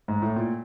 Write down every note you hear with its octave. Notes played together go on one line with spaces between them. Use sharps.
G#2
A2
A#2